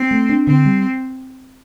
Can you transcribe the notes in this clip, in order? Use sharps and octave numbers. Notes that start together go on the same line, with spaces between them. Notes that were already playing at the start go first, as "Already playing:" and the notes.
Already playing: C4
A3
D4
D3 C4
G3